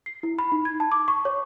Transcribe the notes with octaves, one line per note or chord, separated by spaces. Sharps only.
C7
E4
B5
D#4
G#6
A5
D6
C#6
C#5